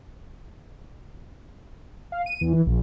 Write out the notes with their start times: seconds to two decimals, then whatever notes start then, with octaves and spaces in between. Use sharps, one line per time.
2.12 F5
2.26 D#7
2.41 E2
2.53 E3
2.66 A#1